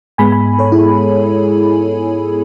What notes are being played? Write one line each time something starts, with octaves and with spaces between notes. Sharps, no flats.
G#2 G#3 B3 G#5 B5
G#5 B5
A4 C#5
E4 G#4